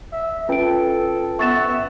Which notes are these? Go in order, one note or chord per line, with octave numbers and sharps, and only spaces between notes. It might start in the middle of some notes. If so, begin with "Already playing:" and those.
E5
C#4 F4 A4 B4 G5 D7
B3 E5 C#6 A6 E7